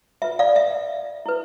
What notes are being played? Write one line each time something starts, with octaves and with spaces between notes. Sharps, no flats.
F4 B4 E5
D5 F5
E5
E4 B4